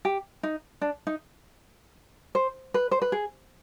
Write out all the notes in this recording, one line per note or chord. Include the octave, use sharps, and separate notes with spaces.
G4
D#4
D4
D#4
C5
B4
C5
B4
G#4